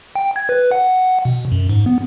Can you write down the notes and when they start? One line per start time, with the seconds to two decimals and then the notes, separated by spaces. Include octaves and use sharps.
0.15 G5
0.36 G#6
0.49 B4
0.71 F#5
1.25 B2
1.52 F#2
1.69 G#2
1.86 B3